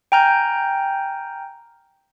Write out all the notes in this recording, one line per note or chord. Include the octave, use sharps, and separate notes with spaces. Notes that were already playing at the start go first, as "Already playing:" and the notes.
G5 G#5 A#5 F6 G6